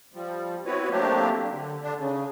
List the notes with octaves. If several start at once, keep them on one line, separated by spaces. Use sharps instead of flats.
F3 G3
B3 C4 E4 F#4 B4 C#5
F#3 A3 A#3 C4 D4 G4
D3
D3 D4
C#3